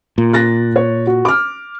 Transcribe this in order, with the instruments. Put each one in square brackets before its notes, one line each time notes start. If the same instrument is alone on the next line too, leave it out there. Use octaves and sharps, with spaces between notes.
[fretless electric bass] A#2
[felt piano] F#6 A6 A#6
C#5
F#4
D6 F6